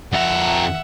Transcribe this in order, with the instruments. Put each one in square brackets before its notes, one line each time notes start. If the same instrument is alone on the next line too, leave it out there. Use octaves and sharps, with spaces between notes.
[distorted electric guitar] F2 A#5 [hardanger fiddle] E5 F#5